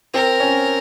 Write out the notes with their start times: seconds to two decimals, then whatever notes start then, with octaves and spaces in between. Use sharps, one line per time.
0.14 C4 A#4
0.40 C#4